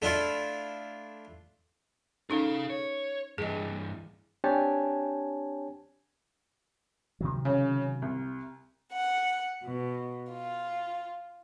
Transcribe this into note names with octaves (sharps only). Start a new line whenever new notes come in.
A3 D4 E4 F4
C#4 D#4 G#4 A4 F5
C#5
G2 E3 G#4 D#5
C4 D4 G4 C#5 G#5 A5
C3 D#3 F#3
C#3
C2
F#5
B2
F4